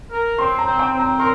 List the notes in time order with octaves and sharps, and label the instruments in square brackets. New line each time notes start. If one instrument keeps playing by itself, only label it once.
[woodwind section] A#4
[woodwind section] C4 [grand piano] C6
[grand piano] A#5
[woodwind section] C4
[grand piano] G5
[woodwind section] C4
[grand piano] A#5
[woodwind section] A#4 [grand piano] C6